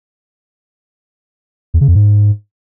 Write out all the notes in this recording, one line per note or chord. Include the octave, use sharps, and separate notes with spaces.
E2
C#3
F2
G#2